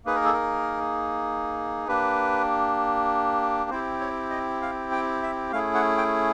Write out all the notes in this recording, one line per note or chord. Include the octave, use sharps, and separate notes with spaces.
A#3 D#4 G#4 B4
A#4
A4
A#4
A#3 D4 G4 B4
C4 E4 G4 C5
C#5
D#5
F5
G5
E5
A3 C#4 E4 G#4 F5
F#5
G5